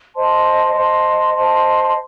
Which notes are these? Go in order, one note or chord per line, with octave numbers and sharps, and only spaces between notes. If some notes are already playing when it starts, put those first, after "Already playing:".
C5 D#5 A5 C6
C5 D#5 A5 C6
C5 D#5 A5 C6